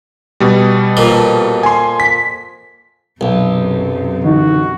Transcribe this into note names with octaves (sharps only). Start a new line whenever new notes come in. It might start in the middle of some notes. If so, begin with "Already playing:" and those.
B2 G3
F2 A#2 F3
G#5 C6
B6
B1 F#2 C3
D3 E3 D#4 F#4